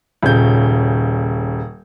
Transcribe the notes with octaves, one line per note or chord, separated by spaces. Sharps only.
D#1 C#3 G6